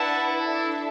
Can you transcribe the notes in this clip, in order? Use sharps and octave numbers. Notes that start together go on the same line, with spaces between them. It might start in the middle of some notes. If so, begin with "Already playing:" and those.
Already playing: D4 E4 B4 F#5 A5
D4 A4 E5 A5